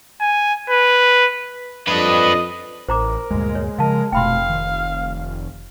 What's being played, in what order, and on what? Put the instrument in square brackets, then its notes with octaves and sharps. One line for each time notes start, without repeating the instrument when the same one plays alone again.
[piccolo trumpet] G#5
B4
[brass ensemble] F2 D#5 [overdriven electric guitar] D4 B4
[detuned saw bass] A1 [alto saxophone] A#4 [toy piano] C5 A#5 D6
[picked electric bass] D2 G2 A#2 [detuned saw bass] G#3
[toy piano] C#5
[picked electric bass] C#3 F3 [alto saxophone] A#4 [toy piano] F5 A5
[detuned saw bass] F1 [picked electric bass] B2 A3 [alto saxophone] F5 [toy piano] G5 B5 C6
[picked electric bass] D#3